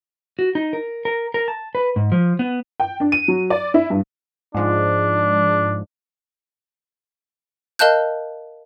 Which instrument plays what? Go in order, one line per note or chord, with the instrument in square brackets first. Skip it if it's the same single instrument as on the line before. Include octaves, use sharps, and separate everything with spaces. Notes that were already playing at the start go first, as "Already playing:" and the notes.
[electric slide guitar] F#4
D#4
A#4
A#4
A#4
A5
B4
G#2
F3
B3
[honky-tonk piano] G5
D4
D#7
F#3
D5
E4
G2
[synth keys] G#2 F3 G#3 [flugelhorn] D4
[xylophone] A#4 D#5 F5 A5 F#6 G6